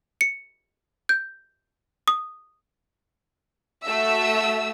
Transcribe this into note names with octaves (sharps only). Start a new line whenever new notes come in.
C#7
G6
D#6
A3 F#4 E5 E6